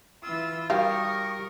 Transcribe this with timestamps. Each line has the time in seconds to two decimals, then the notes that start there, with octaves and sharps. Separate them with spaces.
0.23 E3 F4 E6
0.70 D#3 G3 F#4 G4 A#4 F5 C#6 D#6